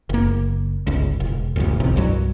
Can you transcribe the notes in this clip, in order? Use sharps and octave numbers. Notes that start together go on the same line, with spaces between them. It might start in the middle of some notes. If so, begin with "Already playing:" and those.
F#1 A#3
G1 C#2
E1
E1 A1 D2
F#1 B1 E2 C3
C2 G2 F#3